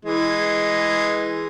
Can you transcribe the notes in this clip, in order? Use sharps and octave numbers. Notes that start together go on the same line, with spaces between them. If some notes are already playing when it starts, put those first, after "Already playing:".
E3 G#3